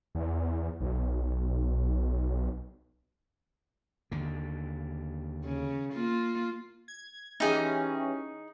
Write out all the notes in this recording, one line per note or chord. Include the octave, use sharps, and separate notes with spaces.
E2
B1
D#2 D3
C#3
A#3 F4
G#6
E3 C#4 D#4 G4 G#4